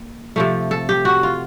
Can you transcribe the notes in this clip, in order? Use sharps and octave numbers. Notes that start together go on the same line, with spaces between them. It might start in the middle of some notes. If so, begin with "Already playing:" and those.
Already playing: A#3
C3 F3 A3
A4
G4
F#4
F4